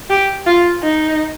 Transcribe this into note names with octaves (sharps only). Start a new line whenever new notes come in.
G4
F4
D#4